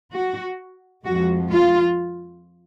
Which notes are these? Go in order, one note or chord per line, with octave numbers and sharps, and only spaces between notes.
F#4
F2 F3 G#3 F#4
F4